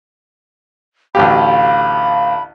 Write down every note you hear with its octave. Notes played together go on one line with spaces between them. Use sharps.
A1 D2 G4 F5 B5